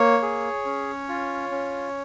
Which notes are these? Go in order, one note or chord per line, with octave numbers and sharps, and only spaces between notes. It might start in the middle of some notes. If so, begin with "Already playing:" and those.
Already playing: A#3 C#5
G#4
C#4
F4
C#4